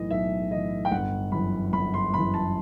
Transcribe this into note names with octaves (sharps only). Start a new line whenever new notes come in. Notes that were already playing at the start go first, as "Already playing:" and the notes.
Already playing: B1 A2 E3 D#5
B1 E5
A2 E3 D#5
G5
G1 F#5
F#2 E3 B5
G1 B5
C6
F#2 E3 B5
A5